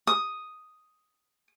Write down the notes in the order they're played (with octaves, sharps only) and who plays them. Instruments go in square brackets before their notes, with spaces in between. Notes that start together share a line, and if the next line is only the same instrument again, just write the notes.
[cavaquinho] D#6